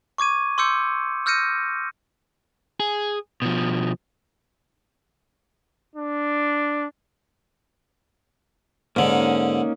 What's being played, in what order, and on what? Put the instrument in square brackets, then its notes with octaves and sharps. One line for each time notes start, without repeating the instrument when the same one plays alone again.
[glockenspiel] C#6 D6 G#6 D#7
C6 D6 E6 G6 C#7
E6 F6 G6 A#6 C#7 D#7
[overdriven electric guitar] G#4
B2 F3
[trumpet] D4
[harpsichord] G#2 D3 [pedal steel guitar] A#3 C#4 D#4